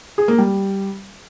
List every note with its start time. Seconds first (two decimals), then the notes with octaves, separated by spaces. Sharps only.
0.18 G#4
0.28 A#3
0.38 G3